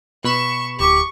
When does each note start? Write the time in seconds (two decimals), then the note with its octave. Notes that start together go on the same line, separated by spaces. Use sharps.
0.24 B2 B5 C#6 E7
0.80 D1 G4 C#6